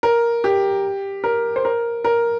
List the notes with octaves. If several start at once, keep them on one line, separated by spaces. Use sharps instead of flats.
A#4
G4
A#4
C5
A#4
A#4